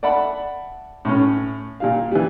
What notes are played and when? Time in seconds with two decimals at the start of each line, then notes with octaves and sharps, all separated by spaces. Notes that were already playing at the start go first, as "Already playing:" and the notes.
0.03 D5 E5 F#5 A5 B5
1.05 A2 C#4
1.80 A#2 G3 F5
2.11 E3 G3